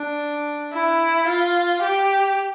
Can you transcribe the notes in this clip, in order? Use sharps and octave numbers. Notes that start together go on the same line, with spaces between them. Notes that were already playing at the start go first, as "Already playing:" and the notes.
Already playing: D4
E4
F4
G4